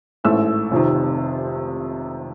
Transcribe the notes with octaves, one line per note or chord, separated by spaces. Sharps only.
A1 G#2 E3 A3 E6
F1 F2 C3 D#3